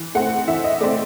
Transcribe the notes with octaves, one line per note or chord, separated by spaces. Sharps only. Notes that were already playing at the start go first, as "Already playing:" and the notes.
Already playing: E3
A3 C4 F#5
E3 E5
D#5
A3 C4 D5